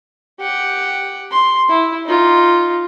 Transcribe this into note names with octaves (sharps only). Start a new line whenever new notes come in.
G4 F#5
C6
E4
D#4 F4